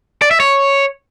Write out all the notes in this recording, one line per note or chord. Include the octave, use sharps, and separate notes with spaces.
D5
E5
C#5